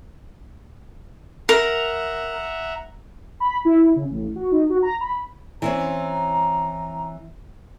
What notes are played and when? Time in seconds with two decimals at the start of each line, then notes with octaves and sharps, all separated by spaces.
1.49 A#4 E5 F#5 A#5
3.40 B5
3.65 E4
3.96 C#3
4.10 A1
4.36 F#4
4.52 D#4
4.70 F#4
4.82 A#5
5.01 B5
5.62 E3 C4 C#4 A#5